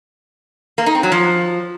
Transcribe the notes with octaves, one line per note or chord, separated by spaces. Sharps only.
A#3
D#4
C4
F#3
F3